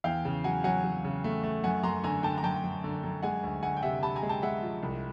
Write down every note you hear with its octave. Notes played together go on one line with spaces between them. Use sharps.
E2 F5 G5
C#3
F#3 F#5 G#5
F#3 F#5 G#5
F#3
C#3
A3
A3
F#2 F#5 G#5
F#2 A#5 C6
D3 G#5 A#5
D3 G5 A5
A#5
F#2 G5 A5
F#2
D3
F#2
G#3 F#5 G#5
D2
D2 F#5 G#5
G5
C3 E5 F#5
C3 A5 B5
G#5 A#5
G#3
G5 A5
G#3 E5 F#5
F3
C2